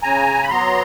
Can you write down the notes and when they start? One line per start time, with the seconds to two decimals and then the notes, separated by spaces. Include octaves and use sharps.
0.03 C#3 G#5 A#5
0.43 B5
0.50 F#3 B3 A#5 C6